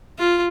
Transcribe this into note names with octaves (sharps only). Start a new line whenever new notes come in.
F4